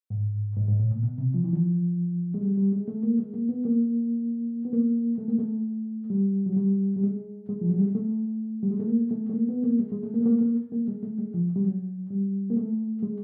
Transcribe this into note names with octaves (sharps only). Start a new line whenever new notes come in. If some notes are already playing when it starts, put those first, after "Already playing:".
G#2
G#2
G#2
A2
A#2
B2
C3
F3
E3
F3
G#3
G3
G3
G#3
A3
A#3
G#3
A#3
B3
A#3
B3
A#3
A3
A#3
A3
G3
F#3
G3
G3
G#3
G#3
F3
F#3
G3
G#3
A3
G3
G#3
A3
A#3
A3
A3
A#3
B3
A#3
G#3
G#3
A3
A#3
A3
A#3
A#3
A#3
G#3
A3
G#3
F3
G3
F#3
G3
A#3
A3
G#3